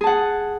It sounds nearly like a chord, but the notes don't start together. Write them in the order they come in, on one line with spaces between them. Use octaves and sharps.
G#4 A5 F#5